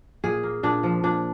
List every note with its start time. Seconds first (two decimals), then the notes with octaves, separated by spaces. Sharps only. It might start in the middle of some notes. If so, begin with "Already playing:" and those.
0.24 A#2 G#4
0.43 A#3
0.63 A#2 D4
0.83 F3
1.03 A#2 D4